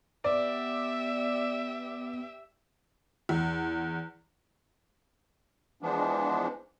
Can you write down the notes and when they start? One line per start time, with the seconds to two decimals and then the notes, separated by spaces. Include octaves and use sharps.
0.24 B3 G4 D5 E5
3.29 E2
5.82 E3 F3 G#3 B3 D4